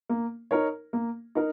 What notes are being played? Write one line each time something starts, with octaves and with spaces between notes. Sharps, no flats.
A#3
D#4 A#4 C#5
A#3
D#4 A#4